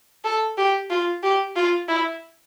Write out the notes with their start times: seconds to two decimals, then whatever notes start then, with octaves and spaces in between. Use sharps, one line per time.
0.24 A4
0.58 G4
0.90 F4
1.23 G4
1.56 F4
1.88 E4